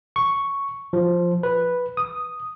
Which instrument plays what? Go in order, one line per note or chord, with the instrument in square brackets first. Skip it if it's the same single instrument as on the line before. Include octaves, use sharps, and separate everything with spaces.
[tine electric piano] C#6
F3
B4
D#6